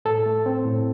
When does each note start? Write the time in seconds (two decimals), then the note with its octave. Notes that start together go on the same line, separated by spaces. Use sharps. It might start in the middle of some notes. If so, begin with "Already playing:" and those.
0.05 A2 A4
0.26 A3
0.46 C4
0.66 A2